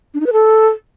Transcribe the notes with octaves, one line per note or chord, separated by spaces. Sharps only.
D4
D#4
B4
A4